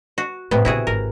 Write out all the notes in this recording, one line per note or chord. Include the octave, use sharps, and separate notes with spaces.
F#4
A2 C3 B3
A#2 C#3 E4 F#4 G#4
G#1 A#4